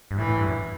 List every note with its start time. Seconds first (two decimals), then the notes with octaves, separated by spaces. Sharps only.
0.11 G2
0.17 A2 E3
0.28 A2
0.38 G2
0.48 F#2